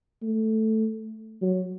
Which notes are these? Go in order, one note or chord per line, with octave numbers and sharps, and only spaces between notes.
A3
F#3